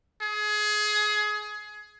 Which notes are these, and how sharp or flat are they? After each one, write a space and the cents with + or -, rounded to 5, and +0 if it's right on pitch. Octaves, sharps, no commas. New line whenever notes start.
G#4 +25